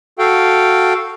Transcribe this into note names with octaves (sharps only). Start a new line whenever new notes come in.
F#4 A4 F5 G5